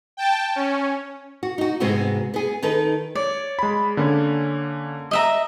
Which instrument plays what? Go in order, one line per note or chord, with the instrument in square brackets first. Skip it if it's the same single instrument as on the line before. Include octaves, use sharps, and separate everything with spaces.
[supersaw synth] G5 A5
C#4
[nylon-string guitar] F#4
D#4 F#4
G#2 C3 G#3 B3 C4 F#4
B3 G#4
D#3 D#4 A4 B4
[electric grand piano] C#5 [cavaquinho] D5
[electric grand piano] G#3 B5
D3 A#3 C#4
[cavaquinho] D#5 E5 A#5